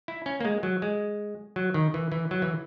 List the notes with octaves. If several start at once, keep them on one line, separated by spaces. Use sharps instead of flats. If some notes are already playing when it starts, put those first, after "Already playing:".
E4
C#4
A#3
G#3
F#3
G#3
F#3
D#3
E3
E3
F#3
E3